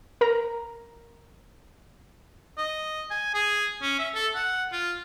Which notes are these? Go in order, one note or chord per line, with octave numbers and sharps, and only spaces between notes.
A#4 A#5
D#5
G#5
G#4
C#4
E5
A4
F#5
F4